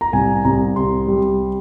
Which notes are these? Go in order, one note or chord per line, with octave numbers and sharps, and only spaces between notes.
A#5
C2 G#5
C2 A#5
C3 C6
G3